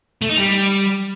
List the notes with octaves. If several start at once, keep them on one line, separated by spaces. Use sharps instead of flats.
A3
D#4
G3